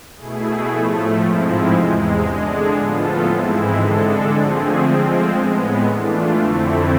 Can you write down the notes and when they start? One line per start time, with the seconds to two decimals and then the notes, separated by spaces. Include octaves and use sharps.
0.17 B2 A3 E4 G#4
0.68 A2 F3 A3
1.20 G#2 F3 G#3 C4 E4
1.72 E2 C3 G#3
2.24 D3 G#3 D4 G#4
2.75 A2 F3 B3 F4 A4
3.26 G#2 E3 G#3 C4 E4
3.78 D3 G#3 D4 A4
4.29 D3 F3 A3 C4 G#4
4.81 F3 G#3 C4
5.32 A2 G#3 B3
5.84 E3 A3 D4 F4
6.35 F2 D3 A3 C4 E4